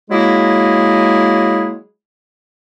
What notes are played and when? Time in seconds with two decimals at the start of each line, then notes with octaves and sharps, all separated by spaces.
0.10 F#3 G#3 A#3 E4 G#4